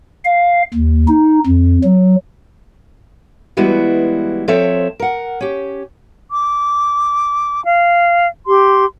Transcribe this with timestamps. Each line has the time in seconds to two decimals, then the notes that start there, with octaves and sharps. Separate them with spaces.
0.25 F5
0.74 D#2
1.08 D#4
1.46 F2
1.84 F#3
3.57 E3 G3 G#3 B3 E4 F#4
4.48 F3 C4 A4 C#5 E5
5.00 A#4 F#5
5.41 C#4 G4
6.30 D6
7.64 F5
8.47 G4 C6